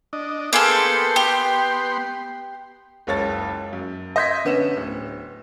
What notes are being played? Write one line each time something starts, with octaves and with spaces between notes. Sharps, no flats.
D4 D#5
A#3 B3 G#4 A4 G5 C6
G4
F#1 C#2 C#5 A5 A6
F#2
D#5 E5 C6 G6 G#6 B6
D3 B3 C#4 E7
D1